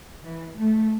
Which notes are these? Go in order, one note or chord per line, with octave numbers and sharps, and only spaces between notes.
E3
A3